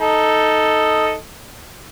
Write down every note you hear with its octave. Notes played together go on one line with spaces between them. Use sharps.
D#4 A4 D#5